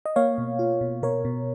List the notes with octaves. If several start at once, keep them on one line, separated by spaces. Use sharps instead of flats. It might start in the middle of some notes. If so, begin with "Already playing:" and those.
D#5
A#3 C#5 F5
B2
F4
B2
B2 A#4 C#5
B2